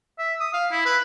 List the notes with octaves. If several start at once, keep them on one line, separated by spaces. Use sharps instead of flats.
E5
D#6
F5
E4
B4